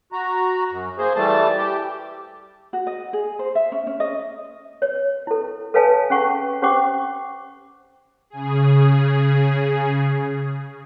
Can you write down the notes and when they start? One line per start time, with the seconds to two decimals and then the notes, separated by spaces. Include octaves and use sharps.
0.12 F#4 A#5
0.71 F#2
0.98 A#3 G#4 C5
1.16 E3 G3 A3 A5
1.57 G4
2.73 F#4
2.87 D#5
3.13 G#4
3.39 C5
3.55 E5
3.72 C#4
3.87 C#4
4.00 D#5
4.82 C#5
5.27 E4 A4
5.74 A4 B4 C#5 F5 G#5 A5
6.10 C#4 G#4 F#5 C#6
6.62 C#4 G4 C5 F#5 C#6 D6
8.30 C#3 G#4